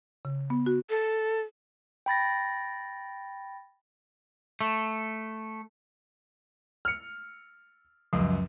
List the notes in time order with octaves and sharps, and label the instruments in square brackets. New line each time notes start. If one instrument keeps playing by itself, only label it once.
[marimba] C#3
B3
F#4
[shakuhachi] A4
[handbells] G5 B5 A6 A#6
[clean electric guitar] A3
[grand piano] F6 C#7
[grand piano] C#2 F#2 [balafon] F3